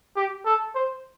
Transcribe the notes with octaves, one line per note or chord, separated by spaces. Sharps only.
G4
A4
C5